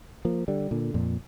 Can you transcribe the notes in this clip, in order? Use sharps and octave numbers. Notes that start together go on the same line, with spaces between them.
F3 A#3
D3 G3
A#2 D3
F2 A#2